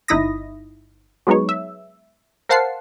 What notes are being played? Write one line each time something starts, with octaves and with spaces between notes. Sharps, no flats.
G1 D#4 E4 B5 D#6 A#6
F#3 G#3 B3 D#4 C#5
E5
A#4 C5 F5 F#5 A5 C7